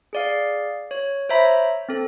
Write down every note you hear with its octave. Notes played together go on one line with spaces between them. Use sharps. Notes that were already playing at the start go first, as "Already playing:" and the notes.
G#4 D5 F5
C#5
C5 C#5 E5 A#5 B5
C4 A4